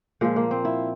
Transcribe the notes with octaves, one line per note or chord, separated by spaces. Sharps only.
A#2 F3 G#3
A#3
C4
E4